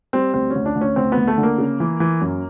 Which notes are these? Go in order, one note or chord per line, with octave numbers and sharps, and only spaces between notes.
G3 C4
D2 C4
C#4
D2
D4
D2
C#4
D2 C4
B3
D2
A3
D3
A#3
C#3
E3
E3
F#2